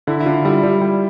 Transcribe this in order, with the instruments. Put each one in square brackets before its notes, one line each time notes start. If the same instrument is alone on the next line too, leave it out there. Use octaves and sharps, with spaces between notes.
[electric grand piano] D3 [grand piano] E4
[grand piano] E4
[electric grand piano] D3 [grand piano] F4
[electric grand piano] G3 [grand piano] E4
[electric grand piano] G3 [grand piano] E4
[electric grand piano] G3